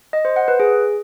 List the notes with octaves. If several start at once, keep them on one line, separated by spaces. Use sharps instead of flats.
D#5
C5
F#5
B4
G#4